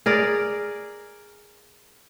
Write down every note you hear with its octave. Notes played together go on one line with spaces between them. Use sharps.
G#4 A#4 D5